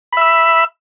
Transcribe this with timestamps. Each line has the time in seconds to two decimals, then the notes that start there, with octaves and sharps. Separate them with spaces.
0.13 B5
0.17 E5
0.21 E6